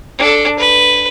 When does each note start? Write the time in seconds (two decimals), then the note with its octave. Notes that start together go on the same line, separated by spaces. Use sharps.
0.19 D4 A4
0.59 B4